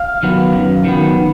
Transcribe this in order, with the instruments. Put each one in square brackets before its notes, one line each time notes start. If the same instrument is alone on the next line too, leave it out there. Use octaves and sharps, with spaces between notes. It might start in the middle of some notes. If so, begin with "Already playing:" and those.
Already playing: [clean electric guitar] F5
D#3 F#3 B3
F#2
D#3 F#3 B3